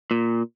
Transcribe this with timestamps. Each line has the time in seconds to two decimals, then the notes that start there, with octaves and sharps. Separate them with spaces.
0.11 A#2